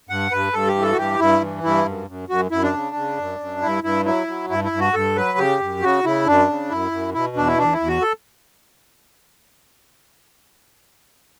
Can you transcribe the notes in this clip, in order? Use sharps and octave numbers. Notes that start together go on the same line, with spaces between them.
G2 F#5
G2 B4
G2 A4
G4
E3
A4
F#4
G2 G4
G2 E4
E3
G2 E4
F#2
F#2
F#2 F#4
F#2 E4
D4
C#3
C#3
F#2
F#2
G2 E4
G2 E4
F#3 E4
F#3
G2 E4
E4
G2
F#4
G2 A4
F#3 B4
C#3 G4
F#2
C#3 F#4
C#3 E4
F#2 D4
C#3
F#2 E4
F#2
B2 E4
E2 D4
E4
E2 D4
E4
E2
F#4
A4